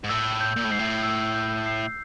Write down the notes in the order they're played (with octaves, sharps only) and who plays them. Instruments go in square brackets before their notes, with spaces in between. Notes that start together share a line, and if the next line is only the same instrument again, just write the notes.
[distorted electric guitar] G#2
[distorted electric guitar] A2 [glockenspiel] E6
[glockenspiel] G6
[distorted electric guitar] A#2
A2
[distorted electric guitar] G#2 [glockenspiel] C7
[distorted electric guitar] A2
[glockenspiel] E6
G6
C7